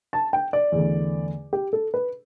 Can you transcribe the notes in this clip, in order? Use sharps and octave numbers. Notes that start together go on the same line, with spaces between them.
A5
G5
D5
E2 D3 A3
G4
A4
B4